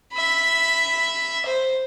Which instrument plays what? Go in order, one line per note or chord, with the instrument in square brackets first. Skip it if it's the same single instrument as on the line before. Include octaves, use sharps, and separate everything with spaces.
[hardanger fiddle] E5 B5
C5